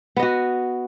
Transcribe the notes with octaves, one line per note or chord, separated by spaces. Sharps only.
B3 F#4 D#5